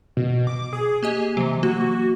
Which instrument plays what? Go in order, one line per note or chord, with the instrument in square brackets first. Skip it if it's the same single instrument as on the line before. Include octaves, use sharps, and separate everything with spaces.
[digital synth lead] B2
D6
G#4
[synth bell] A#3 G4 D#5 [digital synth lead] G#5
[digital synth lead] C3 [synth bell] E3 F#3
[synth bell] A#3 [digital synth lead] F#4